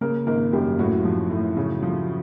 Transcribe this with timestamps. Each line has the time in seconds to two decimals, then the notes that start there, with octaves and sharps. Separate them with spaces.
0.01 C#3 A#3 A#4
0.27 G#1 A#3 A#4
0.53 F#2 G3 G4
0.79 A2 F#3 F#4
1.05 F3
1.31 A2
1.57 C#3
1.83 F3